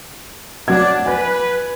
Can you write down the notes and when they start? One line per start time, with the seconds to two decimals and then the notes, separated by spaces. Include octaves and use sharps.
0.68 F#3 D4 D5 F#5 G#6
1.06 B4 G#5